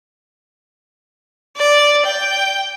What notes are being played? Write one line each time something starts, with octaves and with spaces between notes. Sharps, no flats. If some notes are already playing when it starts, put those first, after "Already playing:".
D5
G5